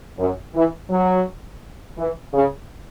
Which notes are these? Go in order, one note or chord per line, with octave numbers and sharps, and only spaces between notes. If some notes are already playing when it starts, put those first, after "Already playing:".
F#2
E3
F#3
E3
C#3